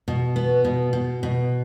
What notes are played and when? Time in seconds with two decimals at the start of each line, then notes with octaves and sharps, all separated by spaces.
0.08 B2
0.36 B3
0.65 B2
0.93 B2
1.23 B2